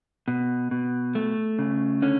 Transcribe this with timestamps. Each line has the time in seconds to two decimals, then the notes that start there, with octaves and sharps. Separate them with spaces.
0.28 B2
0.71 B2
1.15 A3
1.59 C#3
2.02 D3 C#4